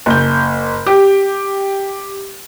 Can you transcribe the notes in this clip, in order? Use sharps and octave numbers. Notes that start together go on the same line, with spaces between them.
F#1 G6
G4